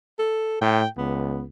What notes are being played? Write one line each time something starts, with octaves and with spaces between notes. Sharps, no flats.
A4
A2 G5
C#2 B3